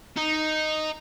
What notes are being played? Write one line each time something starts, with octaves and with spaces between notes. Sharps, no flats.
D#4